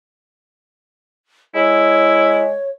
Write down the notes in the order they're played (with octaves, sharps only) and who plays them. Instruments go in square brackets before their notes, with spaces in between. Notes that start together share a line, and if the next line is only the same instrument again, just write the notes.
[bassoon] G#3 [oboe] E4 [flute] C#5